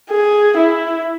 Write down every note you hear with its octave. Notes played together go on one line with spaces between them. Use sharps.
G#4
E4